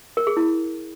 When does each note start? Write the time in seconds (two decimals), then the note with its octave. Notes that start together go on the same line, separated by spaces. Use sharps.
0.17 A#4
0.27 G#4
0.37 E4